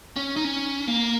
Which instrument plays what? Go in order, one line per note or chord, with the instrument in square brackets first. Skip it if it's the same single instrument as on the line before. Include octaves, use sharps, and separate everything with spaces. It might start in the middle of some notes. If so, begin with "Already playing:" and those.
[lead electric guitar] C#4
D#4
C#4
A#3